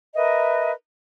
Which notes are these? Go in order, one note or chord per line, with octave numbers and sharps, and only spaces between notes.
A#4 B4 D#5 E5